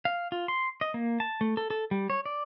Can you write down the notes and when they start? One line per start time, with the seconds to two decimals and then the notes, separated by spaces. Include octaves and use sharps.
0.05 F5
0.32 F4
0.48 C6
0.81 D#5
0.94 A#3
1.20 A5
1.41 A3
1.57 A4
1.70 A4
1.91 G3
2.10 C#5
2.26 D5